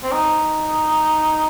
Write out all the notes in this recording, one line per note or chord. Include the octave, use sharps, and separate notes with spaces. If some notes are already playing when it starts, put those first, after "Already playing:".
C4
D#4